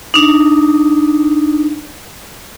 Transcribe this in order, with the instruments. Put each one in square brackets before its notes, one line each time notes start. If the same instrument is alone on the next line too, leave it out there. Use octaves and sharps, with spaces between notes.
[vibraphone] D4 D#4